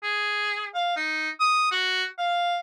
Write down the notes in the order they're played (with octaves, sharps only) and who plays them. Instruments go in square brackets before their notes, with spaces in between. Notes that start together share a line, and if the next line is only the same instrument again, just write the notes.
[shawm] G#4
F5
D#4
D#6
F#4
F5